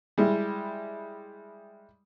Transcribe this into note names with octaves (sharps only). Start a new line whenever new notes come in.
G3 G#3 E4